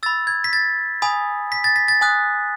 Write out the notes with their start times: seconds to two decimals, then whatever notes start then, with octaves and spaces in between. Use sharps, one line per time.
0.03 B5 E6 A6
0.27 G#6
0.44 B6
0.53 A6
1.02 G#5 B5 D#6
1.52 B6
1.64 A6
1.76 B6
1.88 A6
2.01 G#5 D#6 F#6